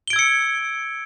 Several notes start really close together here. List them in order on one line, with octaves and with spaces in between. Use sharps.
G7 D7 G#6 E6 C#7